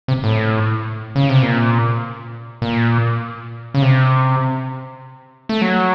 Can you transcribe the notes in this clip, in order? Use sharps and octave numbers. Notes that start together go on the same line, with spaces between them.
C3
A2
C#3
C3
A#2
A#2
C#3
C3
A3
F#3